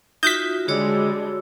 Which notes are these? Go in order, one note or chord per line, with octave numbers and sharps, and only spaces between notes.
D#4 F4 F#4 E5 D#6 G6 A#6 B6
D3 G3 G#3 D4 F#4 C#5 E6